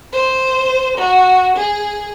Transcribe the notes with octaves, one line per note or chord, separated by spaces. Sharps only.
C5
F#4
G#4